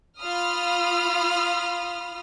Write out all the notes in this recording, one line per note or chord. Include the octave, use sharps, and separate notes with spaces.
F4 B5 D#6 F6